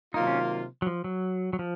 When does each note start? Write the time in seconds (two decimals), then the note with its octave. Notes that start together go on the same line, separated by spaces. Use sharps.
0.14 C3 D#3 F#3 A#3 D#4 F4
0.27 C#4
0.82 F#3
0.86 F3
1.04 F#3
1.53 F#3
1.59 F3